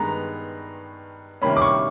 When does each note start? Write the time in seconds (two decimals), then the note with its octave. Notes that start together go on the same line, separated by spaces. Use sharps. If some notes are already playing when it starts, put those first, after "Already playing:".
Already playing: G2 D#3 G#3 B3 A#5
1.42 C3 D#3 G3 A#3 C#4 B5
1.57 D6
1.62 C#6